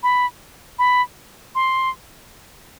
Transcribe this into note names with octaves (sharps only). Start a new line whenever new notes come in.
B5
B5
C6